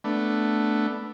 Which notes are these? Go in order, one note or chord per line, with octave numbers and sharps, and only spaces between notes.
A3 B3 D4